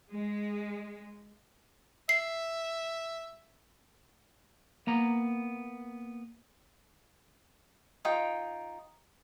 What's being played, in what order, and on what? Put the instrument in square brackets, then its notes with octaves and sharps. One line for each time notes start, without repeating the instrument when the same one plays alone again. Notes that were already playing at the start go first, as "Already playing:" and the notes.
[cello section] G#3
[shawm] E5 [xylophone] C7
[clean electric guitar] A#3 B3 A#5
[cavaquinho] D#4 F4 G5